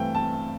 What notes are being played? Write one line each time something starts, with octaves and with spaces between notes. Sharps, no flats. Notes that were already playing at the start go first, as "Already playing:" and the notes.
Already playing: G2 E3 A3 C4 G5
A5